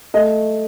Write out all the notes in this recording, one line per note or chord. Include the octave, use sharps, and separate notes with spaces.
A3 D#5